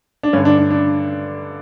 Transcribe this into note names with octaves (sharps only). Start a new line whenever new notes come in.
D4
G2 D3 C#4
D4
D4
D4